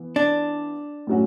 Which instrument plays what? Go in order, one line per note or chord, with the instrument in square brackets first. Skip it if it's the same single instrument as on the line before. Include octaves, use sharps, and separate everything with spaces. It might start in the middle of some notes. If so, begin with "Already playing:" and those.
Already playing: [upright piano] E3 B3
[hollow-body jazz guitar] D4
[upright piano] A2 F#3 C#4 F#4